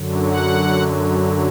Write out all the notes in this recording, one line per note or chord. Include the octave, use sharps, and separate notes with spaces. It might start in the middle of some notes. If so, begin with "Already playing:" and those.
Already playing: F#2 D3 F#3
F#5